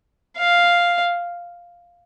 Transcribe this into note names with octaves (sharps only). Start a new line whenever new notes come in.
F5